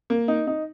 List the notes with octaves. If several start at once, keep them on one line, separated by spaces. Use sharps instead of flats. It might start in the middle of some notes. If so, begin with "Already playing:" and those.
A#3
D#4
D#4